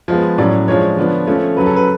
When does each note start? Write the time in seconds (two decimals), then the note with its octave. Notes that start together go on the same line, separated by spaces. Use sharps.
0.08 F3 G#3 B3
0.38 A2 F#3 C#4 D5
0.68 F3 G#3 D4 C#5
0.97 D3 F3 B3 D4
1.27 F3 A3 C#4
1.57 C#3 F#3 C#4 B4
1.66 A4
1.76 B4